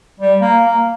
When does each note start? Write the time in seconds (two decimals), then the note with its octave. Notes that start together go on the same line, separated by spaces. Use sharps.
0.20 G3
0.41 A#3
0.64 A#3